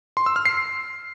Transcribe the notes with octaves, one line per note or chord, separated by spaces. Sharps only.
C6
E6
F6
C7